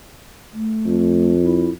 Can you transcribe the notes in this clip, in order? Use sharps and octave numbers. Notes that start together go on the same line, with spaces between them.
A3
F2
E4